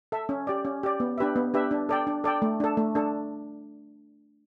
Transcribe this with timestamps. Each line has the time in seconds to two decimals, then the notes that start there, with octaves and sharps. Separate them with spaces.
0.12 A4 E5
0.29 C#4
0.47 G4 D5
0.65 C#4
0.83 G4 D5
1.00 B3
1.18 D4 G4 B4 E5
1.36 B3
1.54 D4 G4 B4 E5
1.71 D4
1.89 A4 D5 G5
2.07 D4
2.24 A4 D5 G5
2.42 A3
2.60 D4 A4
2.77 A3
2.95 D4 A4